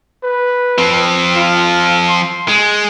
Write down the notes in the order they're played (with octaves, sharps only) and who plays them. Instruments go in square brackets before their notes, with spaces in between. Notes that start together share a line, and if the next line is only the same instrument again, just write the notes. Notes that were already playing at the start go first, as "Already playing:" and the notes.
[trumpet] B4
[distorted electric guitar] F3 C4
[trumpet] F4
C6
[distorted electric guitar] G#3